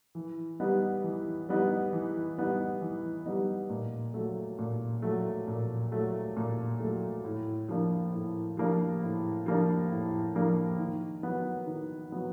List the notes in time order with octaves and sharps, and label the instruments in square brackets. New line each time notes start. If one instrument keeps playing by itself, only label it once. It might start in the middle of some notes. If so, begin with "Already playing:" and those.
[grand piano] E3
G3 B3 D#4
E3
G3 B3 D#4
E3
G3 B3 D#4
E3
G3 B3 D#4
A#2
F#3 A3
A#2
F#3 A3
A#2
F#3 A3
A#2
F#3 A3
A2
F3 A#3 D4
A2
F3 A#3 D4
A2
F3 A#3 D4
A2
F3 A#3 D4
D#3
F#3 B3
D#3
F#3 B3